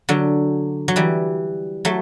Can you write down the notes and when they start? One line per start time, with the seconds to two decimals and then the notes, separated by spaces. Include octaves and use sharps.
0.09 D3 F#3
0.88 F#3
0.96 E3 G3
1.85 F#3 A3